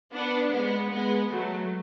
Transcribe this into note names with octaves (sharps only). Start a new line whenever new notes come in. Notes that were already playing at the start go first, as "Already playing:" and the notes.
B3 D4
G#3 B3
G#3 B3
F#3 A3